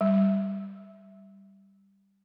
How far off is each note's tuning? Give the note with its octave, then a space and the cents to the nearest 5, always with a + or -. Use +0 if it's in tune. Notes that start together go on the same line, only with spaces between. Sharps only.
G3 +0